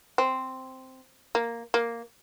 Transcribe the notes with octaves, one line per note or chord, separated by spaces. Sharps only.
C4
A#3
A#3